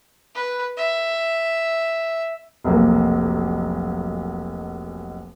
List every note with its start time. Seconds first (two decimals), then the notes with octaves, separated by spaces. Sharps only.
0.35 B4
0.77 E5
2.64 F1 B1 A#3